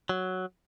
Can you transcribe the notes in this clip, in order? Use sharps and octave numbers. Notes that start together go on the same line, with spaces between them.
F#3